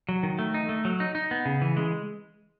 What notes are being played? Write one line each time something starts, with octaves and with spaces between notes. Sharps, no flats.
F#3
D#3
A3
D#4
A3
F#3
D#4
D#4
B3
C#3
E3
G#3